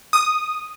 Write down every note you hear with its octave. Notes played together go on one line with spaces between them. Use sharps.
D#6